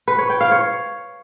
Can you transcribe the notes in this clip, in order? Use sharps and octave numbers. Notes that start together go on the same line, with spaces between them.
B4
C#5
G5
F5
C#5